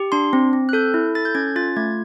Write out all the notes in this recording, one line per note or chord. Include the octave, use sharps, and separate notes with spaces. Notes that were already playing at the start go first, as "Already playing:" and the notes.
Already playing: G4
D4 C6
C4
C4
F#6
A4 G6
E4
A4 A6
G6
C#4 G#6
F4 A6
A3 G#6